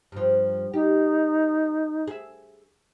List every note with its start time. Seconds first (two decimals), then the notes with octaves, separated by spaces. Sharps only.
0.12 G2 F3
0.74 D#4 G4
2.07 G#4 E5